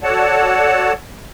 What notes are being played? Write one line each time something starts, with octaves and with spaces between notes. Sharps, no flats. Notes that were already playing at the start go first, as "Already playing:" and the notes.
F#4 A4 C#5 D5 F#5 A5